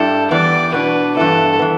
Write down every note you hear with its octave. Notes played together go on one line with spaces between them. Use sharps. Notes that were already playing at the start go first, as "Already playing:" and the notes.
Already playing: G2 G3 E4 A4
E2 E3 G3 B3 D5
B2 B3 D4 B4
G2 E3 B3 E4 A4
E3 B3